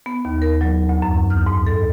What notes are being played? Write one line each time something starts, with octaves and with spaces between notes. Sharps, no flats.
B3
D#2
A#4
F#3
D2
F#2
F6
G#2
A4